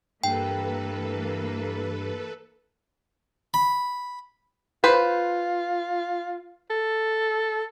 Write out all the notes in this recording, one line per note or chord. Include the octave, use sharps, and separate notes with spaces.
G2 E3 A#3 A4 B4 G5
B5
F4 B4 C5
A4